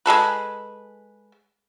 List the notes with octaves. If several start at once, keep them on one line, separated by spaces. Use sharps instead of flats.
G#3 G#4 A4 B4